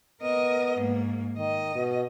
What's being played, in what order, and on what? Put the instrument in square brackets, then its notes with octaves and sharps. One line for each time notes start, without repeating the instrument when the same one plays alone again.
[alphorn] B3 [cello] A#4 D#5
[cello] G#2 A#3
[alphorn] D#3 [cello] D#5
[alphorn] B2